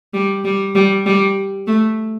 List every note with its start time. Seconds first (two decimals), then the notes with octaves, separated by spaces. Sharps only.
0.14 G3
0.45 G3
0.75 G3
1.06 G3
1.67 A3